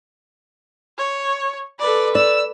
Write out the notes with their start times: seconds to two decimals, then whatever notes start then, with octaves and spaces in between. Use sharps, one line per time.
0.98 C#5
1.79 A4 B4 D5
2.15 D5 E6